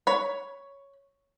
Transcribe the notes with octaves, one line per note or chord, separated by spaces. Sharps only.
C#5 B5